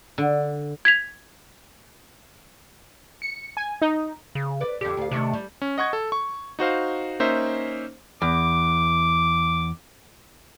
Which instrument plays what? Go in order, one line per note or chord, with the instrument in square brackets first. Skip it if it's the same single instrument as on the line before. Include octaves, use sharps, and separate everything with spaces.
[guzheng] D3
[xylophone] G#6 B6 F7
[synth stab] C#7
G#5
D#4
[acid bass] C#3
[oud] B4 D5
[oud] F2 D3 [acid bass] G4
[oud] D2 F5
[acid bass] C3 [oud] D#3 A3 D4
[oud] G3
[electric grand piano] C#4
D#5 F#5 C#6 G#6
A4
C#6
D#4 F#4 C5 F5
A#3 C#4 D#4 C5 E5
[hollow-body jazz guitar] E2 [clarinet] D6